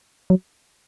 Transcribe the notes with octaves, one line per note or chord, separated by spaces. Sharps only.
F#3